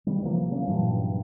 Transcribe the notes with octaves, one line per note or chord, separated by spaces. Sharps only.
C3 D#3 G3
C3 E3 F3 A#3
C3 F#3 A#3 C#4
G2 A#2 E3 F#3